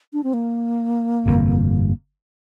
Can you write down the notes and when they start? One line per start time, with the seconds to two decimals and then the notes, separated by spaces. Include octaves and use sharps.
0.13 D4
0.24 C4
0.34 A#3
1.26 G1 F2 C3